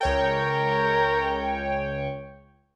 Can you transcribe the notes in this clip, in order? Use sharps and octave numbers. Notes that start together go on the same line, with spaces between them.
C#2 A#4 C#5 G5